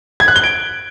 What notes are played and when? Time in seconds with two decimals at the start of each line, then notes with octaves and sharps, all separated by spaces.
0.20 G#6
0.28 F#6
0.36 G7
0.44 D7